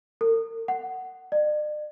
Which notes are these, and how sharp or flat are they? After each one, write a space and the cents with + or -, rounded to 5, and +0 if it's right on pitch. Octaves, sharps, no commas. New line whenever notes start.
A#4 -45
F#5 +10
D5 +45